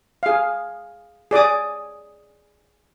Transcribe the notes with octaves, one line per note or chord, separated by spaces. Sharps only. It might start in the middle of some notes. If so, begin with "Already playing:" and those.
G#4 F5
G#4 D5 D6 D#6